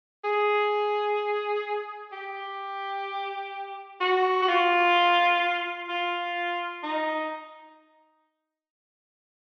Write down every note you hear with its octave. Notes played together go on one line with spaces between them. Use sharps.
G#4
G4
F#4
F#4
F4
F4
D#4